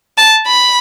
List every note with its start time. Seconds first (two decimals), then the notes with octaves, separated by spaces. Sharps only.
0.18 A5
0.47 B5